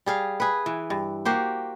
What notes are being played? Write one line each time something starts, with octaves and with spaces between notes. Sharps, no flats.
G3 G#4 F5
G#4 B4
E3
G2
A#3 F#4 G4 C5